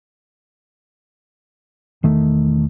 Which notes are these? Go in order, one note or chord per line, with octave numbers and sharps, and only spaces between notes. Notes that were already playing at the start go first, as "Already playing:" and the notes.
E1 D#3 A3